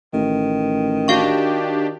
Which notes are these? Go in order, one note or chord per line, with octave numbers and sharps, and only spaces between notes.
A1 D#3
D4 F#4 G4 F5 C#6